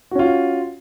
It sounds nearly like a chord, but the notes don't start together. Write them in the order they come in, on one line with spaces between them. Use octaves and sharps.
F#4 C#4 F4